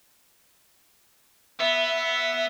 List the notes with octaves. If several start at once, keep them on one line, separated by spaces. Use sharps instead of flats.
B3 E5